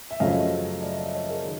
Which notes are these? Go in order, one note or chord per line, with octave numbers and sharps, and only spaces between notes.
E5
F#2 C#3 F3 A3 C#4 D#5 F5
D5 E5
D5 E5
C#5 D#5
G#4 A#4
D#3